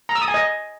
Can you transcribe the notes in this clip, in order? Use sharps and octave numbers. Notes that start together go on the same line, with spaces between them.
A#5
E6
D#6
G#5
D#5